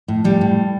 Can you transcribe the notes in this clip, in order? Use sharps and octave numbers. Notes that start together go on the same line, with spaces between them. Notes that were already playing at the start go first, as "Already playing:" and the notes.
A2
A2 G3
A2